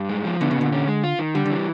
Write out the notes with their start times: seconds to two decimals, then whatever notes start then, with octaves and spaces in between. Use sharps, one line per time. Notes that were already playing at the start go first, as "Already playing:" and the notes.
Already playing: G2
0.09 G#3
0.25 F3
0.41 D3 B3
0.51 C#3
0.56 A#2 D3
0.73 C#4
0.88 G#3
1.03 F4
1.19 D#3
1.35 D3 G3
1.46 D3
1.50 E3